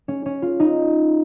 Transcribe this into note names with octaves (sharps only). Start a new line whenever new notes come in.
C#4
C#4
F4
D#4